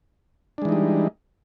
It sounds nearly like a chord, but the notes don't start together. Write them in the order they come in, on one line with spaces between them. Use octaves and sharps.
D4 G#3 E3 D#4 G3